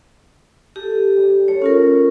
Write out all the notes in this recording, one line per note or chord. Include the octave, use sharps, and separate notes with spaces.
G4 A4 A#4
G3
F#2 A3 C#5 A5
C#4 F4 A#4